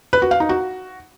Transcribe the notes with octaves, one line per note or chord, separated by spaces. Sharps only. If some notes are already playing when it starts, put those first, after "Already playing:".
B4
F#4
F5
D#4
F#4